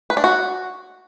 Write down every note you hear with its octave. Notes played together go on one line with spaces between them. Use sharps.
B4
D4
F#4